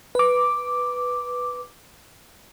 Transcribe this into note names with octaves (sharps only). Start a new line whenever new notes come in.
B4 D6